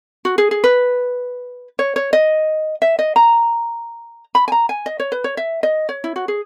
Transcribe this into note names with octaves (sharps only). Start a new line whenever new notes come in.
F#4
G#4
G#4
B4
C#5
C#5
D#5
E5
D#5
A#5
B5
G#5
A#5
G#5
D#5
C#5
B4
C#5
E5
D#5
C#5
E4
F#4
G#4